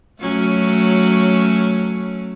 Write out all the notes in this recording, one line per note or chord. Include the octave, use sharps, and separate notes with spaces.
F#3 A3 C#4